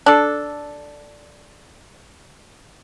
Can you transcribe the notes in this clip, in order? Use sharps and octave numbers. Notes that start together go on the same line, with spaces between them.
D4 A4